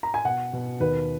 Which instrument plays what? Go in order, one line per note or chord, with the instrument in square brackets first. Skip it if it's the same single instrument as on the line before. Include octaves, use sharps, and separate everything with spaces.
[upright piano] A#5
G#5
B2 F#5
B2
D#2 B4